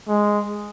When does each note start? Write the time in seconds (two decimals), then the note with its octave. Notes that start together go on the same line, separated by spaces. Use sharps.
0.08 G#3